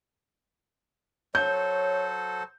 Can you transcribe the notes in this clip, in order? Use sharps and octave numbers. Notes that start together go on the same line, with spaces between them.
F#3 A4 C5 C#5 G6